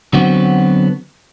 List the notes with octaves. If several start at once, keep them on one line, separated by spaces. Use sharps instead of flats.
D3 F#3 B3 C4 F#4